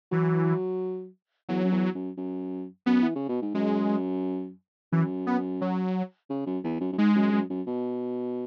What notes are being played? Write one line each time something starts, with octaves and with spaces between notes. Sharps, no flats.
E3 F#3
E2 F#3
F#2
E2
F#2
F#2
F#2 B3
E3
C#3
B2
G#2
F#2 G#3
F#2 E3
B3
F#3
C#3
F#2
E2
F#2
F#2
G#2 G#3
F#2
F#2
F#2
B2